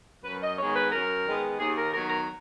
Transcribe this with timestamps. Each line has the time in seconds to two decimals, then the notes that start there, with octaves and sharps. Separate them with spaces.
0.25 F#2 B4
0.42 D#5
0.58 D#3 G#3 B3 C#5
0.75 B4
0.92 F#2 A#4
1.25 D#3 G#3 B3
1.59 D#2 G#4
1.77 A#4
1.93 D#3 F#3 B3 A#4
2.10 A#4